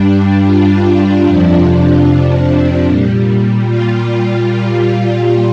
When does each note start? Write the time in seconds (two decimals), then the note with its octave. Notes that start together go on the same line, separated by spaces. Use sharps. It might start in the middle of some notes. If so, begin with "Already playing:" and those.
Already playing: G2 G3 D4
0.44 F4
1.23 F2 C3 F3 D4
2.05 D4
2.84 A#2 G3
3.66 F4
4.46 A#2 G3 F4